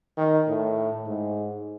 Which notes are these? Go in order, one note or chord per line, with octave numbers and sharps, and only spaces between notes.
D#3
A2
G#2